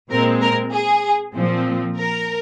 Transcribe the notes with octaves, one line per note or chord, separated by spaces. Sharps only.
A#2 G#3 C4 A#4
A#4
G#4
A#2 F3 C4
A#4